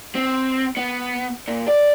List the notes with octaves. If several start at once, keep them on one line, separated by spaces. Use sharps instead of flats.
C4
B3
A#2
D5